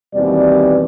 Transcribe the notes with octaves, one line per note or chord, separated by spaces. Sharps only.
D#2 B2 E3 G3 C4 D5